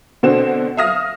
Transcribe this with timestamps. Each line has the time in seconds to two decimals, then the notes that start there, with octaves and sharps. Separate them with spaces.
0.23 B2 D3 C4 F#4 E7
0.77 E5 F5 D#6 F6 A#6